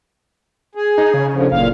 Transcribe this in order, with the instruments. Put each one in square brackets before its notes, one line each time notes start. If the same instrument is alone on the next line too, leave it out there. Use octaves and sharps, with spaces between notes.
[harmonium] G#4
[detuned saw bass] D#4
C#3
[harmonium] D#2 D3 F3
[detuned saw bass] F#1 [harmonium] A#2 F5